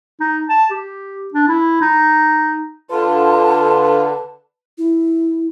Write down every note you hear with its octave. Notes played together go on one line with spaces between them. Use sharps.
D#4
A5
G4
D4
E4
D#4
D3 F4 B4 A5
E4